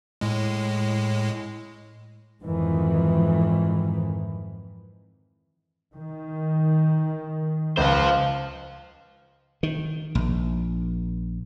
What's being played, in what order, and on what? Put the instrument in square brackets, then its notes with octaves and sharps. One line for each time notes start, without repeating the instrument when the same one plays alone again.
[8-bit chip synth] A2 G#3
[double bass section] F2 G#2 D#3 E3
D#3
[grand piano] C#2 [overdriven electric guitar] C5 F5
[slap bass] D#3
A#1